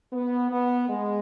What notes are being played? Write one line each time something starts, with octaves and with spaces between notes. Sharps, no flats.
B3
B3
G#3